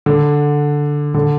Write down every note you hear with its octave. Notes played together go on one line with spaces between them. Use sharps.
D3
D3